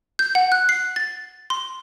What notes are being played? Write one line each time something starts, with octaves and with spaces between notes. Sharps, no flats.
G6
F#5
F#6
C7
A6
C6